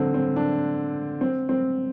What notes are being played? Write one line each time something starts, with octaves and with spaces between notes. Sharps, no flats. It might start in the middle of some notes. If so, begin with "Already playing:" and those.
Already playing: D3 C4
C4
D4
C4
C4